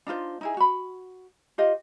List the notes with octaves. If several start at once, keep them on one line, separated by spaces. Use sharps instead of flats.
D4 D#4 F4 C5
D#4 E4 G#4
F#4 B5
F4 G4 D#5 F5